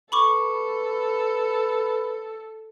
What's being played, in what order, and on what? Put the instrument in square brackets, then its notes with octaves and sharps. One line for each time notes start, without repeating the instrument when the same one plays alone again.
[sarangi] A4 [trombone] B4 [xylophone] B5 C#6 D6